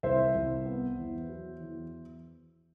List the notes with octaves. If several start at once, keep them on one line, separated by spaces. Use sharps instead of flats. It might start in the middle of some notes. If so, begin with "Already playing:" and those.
C2 C5 E5
C2
B3
E2
F#3
E2